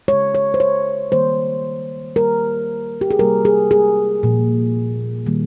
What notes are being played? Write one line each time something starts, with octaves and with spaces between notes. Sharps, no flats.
C#3 G#3 C#5
C#5
C5
C#5
D#3 G3 A#3 C5
D#3 G3 A#3 A#4
G4
G#4
C3 G3 A#3 A#4
G#4
G#4
A#2 F3 A#3
D#3 G3 A#3